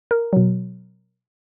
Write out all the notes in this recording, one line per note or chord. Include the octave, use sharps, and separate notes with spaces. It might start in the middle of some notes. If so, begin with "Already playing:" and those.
A#4
B2 F#3